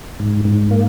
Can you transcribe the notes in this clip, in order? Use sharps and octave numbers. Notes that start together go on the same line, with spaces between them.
G#2
G#2
A#3